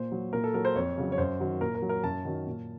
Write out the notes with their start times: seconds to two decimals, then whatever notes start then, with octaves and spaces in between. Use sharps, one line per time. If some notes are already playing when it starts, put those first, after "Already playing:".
Already playing: A#2 C5
0.12 F#3
0.33 A#2 A#4
0.44 A4
0.54 F#3 A#4
0.65 C5
0.76 F2 C#5
0.98 C#3 F#3
1.12 C#5
1.18 F#2 C5
1.40 D#3 F#3
1.61 A#2 A#4
1.75 A#4
1.82 F#3
1.89 A#4
2.04 F#2 A5
2.25 D#3 F#3
2.47 A#2